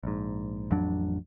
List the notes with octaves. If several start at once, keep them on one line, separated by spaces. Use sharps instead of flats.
A#1 G#2
A1 F2 F#3 D4